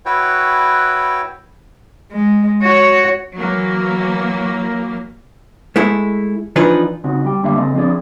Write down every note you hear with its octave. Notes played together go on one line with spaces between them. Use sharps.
E4 F#4 B4 C#5 G5
G#3
F#4 C#5
E3 F#3 A#3
G#3 A3 E4
E3 F3 D4 D#4 F4 B4
C#3 C4 D#4 F#4
G3 G5
F#2 D3 G3 A#3 E5 F5
C#3 C4 A4 D#5
F3 B3 C4 D4 G#4 D5